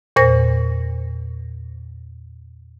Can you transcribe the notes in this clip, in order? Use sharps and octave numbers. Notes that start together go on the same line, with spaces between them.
E2 A#2 C5 A#6